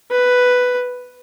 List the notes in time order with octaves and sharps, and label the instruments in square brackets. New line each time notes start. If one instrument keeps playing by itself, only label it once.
[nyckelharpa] B4